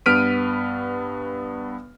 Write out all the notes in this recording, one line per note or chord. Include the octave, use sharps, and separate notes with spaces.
G2 B3 F6 B6 D7 D#7